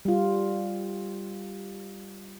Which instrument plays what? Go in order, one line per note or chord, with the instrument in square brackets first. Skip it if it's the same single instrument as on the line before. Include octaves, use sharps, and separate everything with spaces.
[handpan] G3 F4